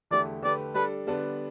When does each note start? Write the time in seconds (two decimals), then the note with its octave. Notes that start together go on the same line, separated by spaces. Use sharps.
0.11 E2 D3 A3 E4 G4 D5
0.42 D3 A3 G4 B4 D5
0.75 G3 D4 A4 B4
1.07 D3 G3 B3 D4 B4